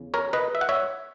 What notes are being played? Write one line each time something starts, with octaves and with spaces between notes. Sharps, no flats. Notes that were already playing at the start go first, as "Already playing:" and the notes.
Already playing: E2 C#3
A#4 C#5
B4 D#5
E5
F#5
C#5 E5